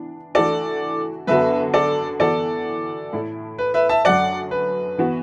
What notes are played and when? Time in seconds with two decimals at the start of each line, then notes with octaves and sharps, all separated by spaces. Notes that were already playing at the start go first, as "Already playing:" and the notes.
Already playing: E3 B3 D4
0.35 E3 A3 D4 F#4 A4 D5
1.27 F#2 D3 B3 F#4 B4 E5
1.74 A4 D5
2.20 E3 B3 F#4 A4 D5
3.13 A2 A3 E4
3.58 B4
3.74 B4 E5
3.89 E5 A5
4.05 F#2 D3 F#3 D5 F#5
4.51 B4
4.98 E3 B3 F#4